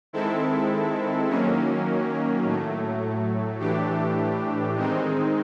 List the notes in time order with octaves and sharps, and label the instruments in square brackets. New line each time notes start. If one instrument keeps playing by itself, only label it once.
[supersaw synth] D#3 G#3 C4 E4 A4
D#3 F#3 A#3 C#4
A2 F#3 A3
A2 E3 A3 D4 G4
D#3 G#3 C4 D#4